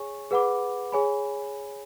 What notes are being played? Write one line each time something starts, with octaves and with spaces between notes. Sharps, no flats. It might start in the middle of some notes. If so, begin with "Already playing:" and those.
Already playing: G#4 C#5 G#5 C#6
G#4 B4 F#5 B5 D6
G#4 C#5 G#5 B5